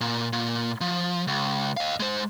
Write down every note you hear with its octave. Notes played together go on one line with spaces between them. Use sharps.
A#2
A#2
F3
C#2
D#5 F5
G#3 C5